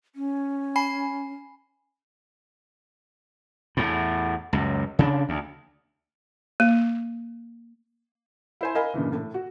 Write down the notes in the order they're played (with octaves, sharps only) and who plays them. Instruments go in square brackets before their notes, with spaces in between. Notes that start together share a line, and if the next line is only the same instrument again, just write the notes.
[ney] C#4
[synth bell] G#5 B5 C7
[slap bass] E2 A2
C#2 F#2
C#3 B3 D4
D2
[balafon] A#3
[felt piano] E4 C5 G#5
A#4 D#5 F5 G#5 B5
G2 A#2 C#3 E3
A2
F#4